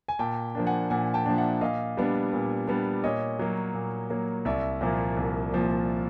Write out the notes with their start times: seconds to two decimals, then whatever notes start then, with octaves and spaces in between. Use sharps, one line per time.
0.08 G#5
0.19 A#2 G5 A5
0.55 F3 A#3 D4
0.67 F#5 G#5
0.90 A#2 F#5 G#5
1.14 G5 A5
1.26 F3 A#3 D4
1.37 E5 F#5
1.61 A#2 D#5 F5
1.97 G3 B3 D4
2.33 A#2
2.67 G3 B3 D4
3.04 A#2 C#5 D#5
3.39 F#3 A#3
3.74 A#2
4.10 F#3 A#3
4.45 C2 D5 E5
4.81 A#2 F3 A#3
5.17 C2
5.52 A#2 F3 A#3